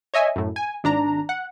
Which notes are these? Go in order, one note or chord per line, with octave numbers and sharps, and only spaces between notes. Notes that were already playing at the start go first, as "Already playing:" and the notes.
C#5 D#5 E5 G#5
F#2 A2
G#5
G#1 D4 A#5
F#5